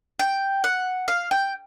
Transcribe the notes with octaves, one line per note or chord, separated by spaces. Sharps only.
G5
F#5
F5
G5